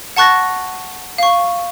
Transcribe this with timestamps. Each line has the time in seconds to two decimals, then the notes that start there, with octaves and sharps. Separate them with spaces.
0.16 F#5 A5 C#6 F#6 A6 A#6
1.18 F5 C#6